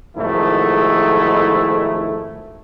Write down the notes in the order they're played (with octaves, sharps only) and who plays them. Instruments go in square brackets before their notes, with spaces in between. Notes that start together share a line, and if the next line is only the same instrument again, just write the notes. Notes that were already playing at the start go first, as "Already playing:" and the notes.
[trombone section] B1 F2 G#2 D#3 A3 E4